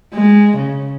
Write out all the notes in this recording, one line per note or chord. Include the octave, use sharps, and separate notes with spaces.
G#3
C#3